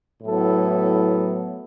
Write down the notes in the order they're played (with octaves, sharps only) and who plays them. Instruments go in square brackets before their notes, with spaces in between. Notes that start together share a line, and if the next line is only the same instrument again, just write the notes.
[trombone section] A2 F#3 B3 E4 A4